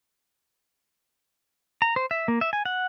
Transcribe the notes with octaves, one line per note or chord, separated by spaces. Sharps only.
A#5
C5
E5
A#3
E5
G#5
F#5